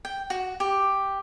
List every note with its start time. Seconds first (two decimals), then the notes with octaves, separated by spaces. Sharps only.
0.05 G5
0.30 F#4
0.60 G4